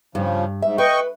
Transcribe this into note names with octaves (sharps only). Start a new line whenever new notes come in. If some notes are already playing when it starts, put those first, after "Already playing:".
G2 C#3 F3
G#2 E5
B4 D#5 G5 C#6